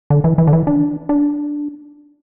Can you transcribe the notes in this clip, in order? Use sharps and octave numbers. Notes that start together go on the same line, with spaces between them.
D3
E3
E3
D3
E3
D4
D4